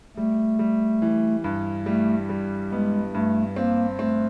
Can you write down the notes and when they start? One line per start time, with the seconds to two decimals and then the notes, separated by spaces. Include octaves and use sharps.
0.17 G3 A3
0.59 G3
1.02 E3
1.44 G2
1.86 G3 A3
2.30 G3
2.72 G#3 B3
3.14 G2 A3
3.56 A#3 C4
3.99 A3 C4